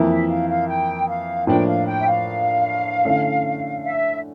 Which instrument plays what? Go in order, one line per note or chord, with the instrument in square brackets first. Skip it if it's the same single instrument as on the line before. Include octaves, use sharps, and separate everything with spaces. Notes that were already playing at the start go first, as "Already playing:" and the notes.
Already playing: [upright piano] F2 E3 A#3 E4
[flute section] E5
F5
F5
G5
F5
[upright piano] A2 F3 A#3 D4 [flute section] G5
[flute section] F5
G5
E5
F5
[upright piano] D3 A3 C#4 E4
[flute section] E5